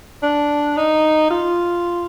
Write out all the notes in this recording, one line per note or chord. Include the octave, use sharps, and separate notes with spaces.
D4
D#4
F4